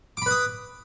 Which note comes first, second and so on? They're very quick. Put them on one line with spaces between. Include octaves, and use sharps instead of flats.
D6 B5 B4 D#6